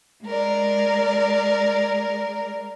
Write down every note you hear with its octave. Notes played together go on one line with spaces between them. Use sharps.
G#3 A#4 D5